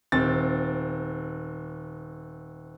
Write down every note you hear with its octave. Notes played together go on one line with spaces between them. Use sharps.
D#1 C4 A6